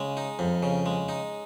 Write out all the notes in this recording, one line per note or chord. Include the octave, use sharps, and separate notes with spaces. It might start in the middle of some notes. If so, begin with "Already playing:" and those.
Already playing: C#3 G#3
D#4
F2
C#3
G#3
D#4